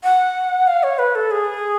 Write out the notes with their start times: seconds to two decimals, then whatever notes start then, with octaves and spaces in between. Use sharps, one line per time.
0.04 F#5
0.67 F5
0.83 C#5
0.99 B4
1.15 A4
1.31 G#4